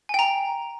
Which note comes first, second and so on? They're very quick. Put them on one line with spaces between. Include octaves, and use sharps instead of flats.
G#5 G5 A#5